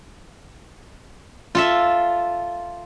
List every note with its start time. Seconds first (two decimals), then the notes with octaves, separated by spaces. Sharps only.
1.55 F4 A4 E5